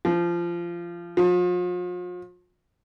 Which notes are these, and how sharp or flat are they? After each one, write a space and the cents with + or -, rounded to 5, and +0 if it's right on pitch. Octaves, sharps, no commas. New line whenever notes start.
F3 -20
F3 +40